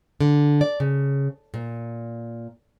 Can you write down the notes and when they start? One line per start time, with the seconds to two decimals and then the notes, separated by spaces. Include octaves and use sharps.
0.20 D3
0.61 D5
0.80 C#3
1.54 A#2